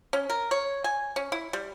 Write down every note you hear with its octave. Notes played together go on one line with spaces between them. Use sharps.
C#4
A#4
C#5
G#5
C#4
E4
G3